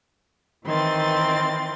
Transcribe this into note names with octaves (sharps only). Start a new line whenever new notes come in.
D#3 E3 C4 C6 A6